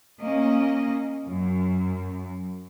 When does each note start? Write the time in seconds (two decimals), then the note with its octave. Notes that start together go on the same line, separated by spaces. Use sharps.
0.20 A#3 C#4 D#5
1.27 F#2